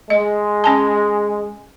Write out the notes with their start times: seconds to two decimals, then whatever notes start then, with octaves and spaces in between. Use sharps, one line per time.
0.10 G#3 D#5
0.64 C#4 G#5 A5